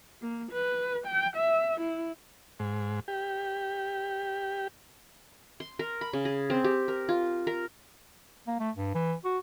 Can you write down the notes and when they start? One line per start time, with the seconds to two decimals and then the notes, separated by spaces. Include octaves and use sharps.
0.21 A#3
0.52 B4
1.07 G5
1.36 E5
1.81 E4
2.60 G#2
3.08 G4
5.60 C6
5.79 A#4
6.01 B5
6.13 C#3
6.25 G#4
6.50 C4
6.64 G4
6.88 A#4
7.09 F4
7.47 A#4
8.47 A#3
8.60 A3
8.77 G2
8.95 E3
9.25 F#4